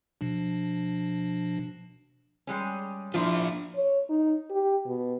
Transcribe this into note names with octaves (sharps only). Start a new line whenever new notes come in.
B2 F3 D4
G3 G#3 C#4
F3 D4 E4 F4
C#5
D#4
G4
B2